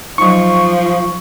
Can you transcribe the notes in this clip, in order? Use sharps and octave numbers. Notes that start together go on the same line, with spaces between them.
F3 F#3 D#4 C#6